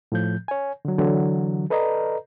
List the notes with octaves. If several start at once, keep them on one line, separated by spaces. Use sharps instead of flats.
A2 F3 G6
C#5 G#5
D3 F#3
D3 E3 F#3
A4 B4 D5 D#5 A#5